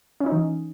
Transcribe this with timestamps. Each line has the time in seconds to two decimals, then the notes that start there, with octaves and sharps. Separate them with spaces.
0.20 C#4
0.26 D#4
0.32 E3